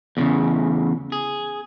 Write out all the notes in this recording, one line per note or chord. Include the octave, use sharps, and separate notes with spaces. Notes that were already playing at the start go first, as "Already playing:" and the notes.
E2 A2 C#3
G#4